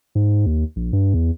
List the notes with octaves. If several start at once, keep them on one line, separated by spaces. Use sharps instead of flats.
G#2
D#2
A#1
G2
E2